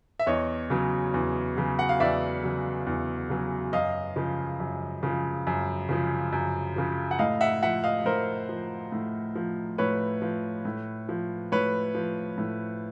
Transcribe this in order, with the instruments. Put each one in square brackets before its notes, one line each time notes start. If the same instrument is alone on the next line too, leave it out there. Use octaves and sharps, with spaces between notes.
[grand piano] E5
E2 C#5 D#5
C#3 F#3
E2
C#3 F#3
F#5
F5
E2 D5 E5
C#3 F#3
E2
C#3 F#3
F#2 D#5 F5
C#3 F3
F#2
C#3 F3
F#2
C#3 F3
F#2
C#3 F3
F#5
A2 D#5 F5
E5 F#5
F3 E5 F#5
D#5 F5
A2 A#4 C5
F3
A2
F3
A2 B4 C#5
F3
A2
F3
A2 B4 C#5
F3
A2